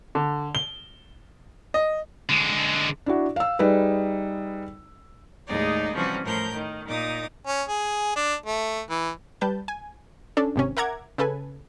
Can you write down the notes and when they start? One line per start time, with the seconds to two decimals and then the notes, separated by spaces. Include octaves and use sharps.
0.15 D3
0.55 G7
1.74 D#5
2.29 D3 G#3
3.06 D4 E4 F#4
3.36 F5 E6
3.59 G3 D#4 G#4 B4
5.47 D#2 A2 G#3 D#4 G#4 D5
5.94 C3 E3 F3 G3 C#4 F#4
6.24 A2 F3 A#4 G6
6.54 D#3
6.87 A#2 D#4 D6 D#6
7.47 C#4
7.68 G#4
8.16 D4
8.46 A3
8.90 E3
9.41 G3 B4 A5 G6
9.68 G#5
10.37 C#4 D4 A4
10.56 G#1 C3 C#4
10.77 A#4 E5 F#5 A#5 D6 G#6
11.18 C#3 A4 B4 G#5